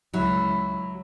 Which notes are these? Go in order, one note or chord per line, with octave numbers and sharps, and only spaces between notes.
C#2 F#3 E4